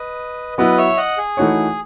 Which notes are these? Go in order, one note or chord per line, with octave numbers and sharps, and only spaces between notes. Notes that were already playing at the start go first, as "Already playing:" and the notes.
Already playing: B4 D#5
F#3 B3 E4 B4 D#5
C#5 E5
D#5 F#5
G#4
E3 A3 D#4 F#4 C#5